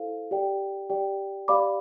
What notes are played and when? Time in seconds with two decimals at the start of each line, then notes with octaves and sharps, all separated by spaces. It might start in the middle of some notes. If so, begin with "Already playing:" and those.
Already playing: E4 A4 C5 F5
0.31 G4 D5 G5
0.90 G4 D5 G5
1.48 G4 D5 F5 B5 D6